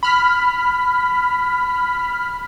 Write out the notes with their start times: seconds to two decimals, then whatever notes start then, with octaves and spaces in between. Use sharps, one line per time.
0.03 B5 F6 B6